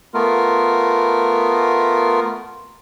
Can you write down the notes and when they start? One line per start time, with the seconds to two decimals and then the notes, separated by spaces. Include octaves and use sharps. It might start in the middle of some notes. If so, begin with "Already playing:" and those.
0.14 A3 B3 F4 A#4